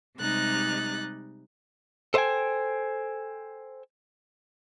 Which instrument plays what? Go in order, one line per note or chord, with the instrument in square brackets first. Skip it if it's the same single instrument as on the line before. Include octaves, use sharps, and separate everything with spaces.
[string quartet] C3 G3 G#3 D#4 F#6 A6
[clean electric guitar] A4 C5 D#5 F5 G5 G#5